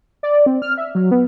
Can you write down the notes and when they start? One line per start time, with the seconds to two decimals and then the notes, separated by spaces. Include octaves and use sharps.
0.23 D5
0.46 C4
0.62 F6
0.78 E5
0.95 F#3
1.11 B3